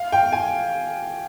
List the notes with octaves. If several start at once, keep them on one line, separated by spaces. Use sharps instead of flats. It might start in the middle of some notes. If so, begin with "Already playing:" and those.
Already playing: F5
G5
G#5